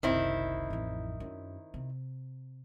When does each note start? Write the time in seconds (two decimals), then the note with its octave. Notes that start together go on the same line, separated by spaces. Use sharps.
0.03 F#1 C2 D#3 C4 E4
0.70 A1 F2
1.20 F#2
1.74 C3